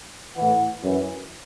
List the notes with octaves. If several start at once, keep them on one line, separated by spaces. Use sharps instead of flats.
A2 E3 F#5
F#2 E3